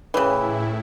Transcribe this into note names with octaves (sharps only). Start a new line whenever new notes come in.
A2 C#3 E3 E4 B4 C#5 G5